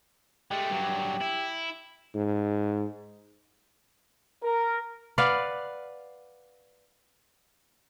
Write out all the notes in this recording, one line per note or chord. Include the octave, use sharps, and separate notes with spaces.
G#3 A3 G4
G2 F#3
E4
G#2
A#4
B4 D5 F5 F#5